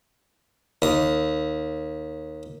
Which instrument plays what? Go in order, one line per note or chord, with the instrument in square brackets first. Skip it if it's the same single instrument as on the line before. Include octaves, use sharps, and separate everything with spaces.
[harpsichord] D#2 D#6